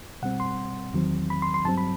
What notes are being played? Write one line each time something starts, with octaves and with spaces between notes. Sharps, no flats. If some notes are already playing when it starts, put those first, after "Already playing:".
B2 G3 C4 F#5
C6
E2 D#3 F#3 C4
B5
C6
C6
G2 F#3 C4 A5
B5